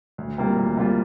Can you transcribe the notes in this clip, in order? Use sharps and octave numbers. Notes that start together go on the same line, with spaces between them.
D2
C3 G3 A#3 F4
D2
C3 G3 A#3 F4